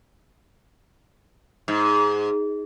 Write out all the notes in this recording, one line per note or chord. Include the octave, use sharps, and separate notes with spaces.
G#2